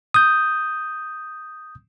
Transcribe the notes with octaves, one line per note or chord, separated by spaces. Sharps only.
D#6 G6